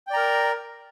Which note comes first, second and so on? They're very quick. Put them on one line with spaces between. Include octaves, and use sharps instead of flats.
G5 D5 A#5 A#4